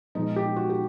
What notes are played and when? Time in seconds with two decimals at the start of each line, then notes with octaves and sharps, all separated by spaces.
0.15 A#2 F3 G#3 B3 D#4
0.36 G4
0.56 F#4
0.70 G4